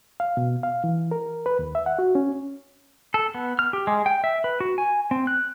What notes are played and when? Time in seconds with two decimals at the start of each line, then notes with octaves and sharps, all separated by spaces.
0.20 F5
0.37 B2
0.63 F5
0.84 E3
1.11 A#4
1.46 B4
1.59 D#2
1.75 E5
1.86 F#5
1.99 F#4
2.15 C#4
3.14 A4
3.35 B3
3.59 F6
3.73 G4
3.87 G#3
4.06 G5
4.24 E5
4.44 B4
4.60 F#4
4.78 G#5
5.11 C4
5.27 F#6